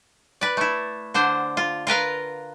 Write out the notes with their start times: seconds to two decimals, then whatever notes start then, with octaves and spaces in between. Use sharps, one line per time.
0.41 B4 D5
0.57 A3 E4
1.14 D3 D4 C5 F#5
1.57 F4
1.87 F4 A#4 B4 F5